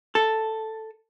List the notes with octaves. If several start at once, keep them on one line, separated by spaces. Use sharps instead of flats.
A4